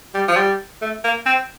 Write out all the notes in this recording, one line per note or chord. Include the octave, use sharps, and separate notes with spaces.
G3
F3
G3
A3
A#3
C4